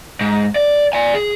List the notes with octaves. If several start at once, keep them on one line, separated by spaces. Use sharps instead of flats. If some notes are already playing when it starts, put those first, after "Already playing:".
G#2
D5
D5 G#5
G#4